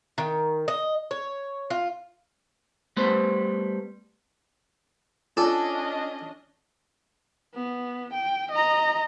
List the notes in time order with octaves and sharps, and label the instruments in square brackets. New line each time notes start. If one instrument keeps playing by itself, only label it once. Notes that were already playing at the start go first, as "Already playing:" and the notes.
[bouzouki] D#3
D#5
C#5
F4
[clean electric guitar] G3 A3 B3 B4 C5
[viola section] C#4 D4 D#5 [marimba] F4 [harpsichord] A4 D5 G#5
[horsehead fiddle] B3
G5
D#5 A#5